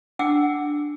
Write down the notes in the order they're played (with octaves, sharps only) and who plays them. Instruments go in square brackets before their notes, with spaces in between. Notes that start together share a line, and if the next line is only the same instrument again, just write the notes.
[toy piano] D4 F#5 G5 D6 E6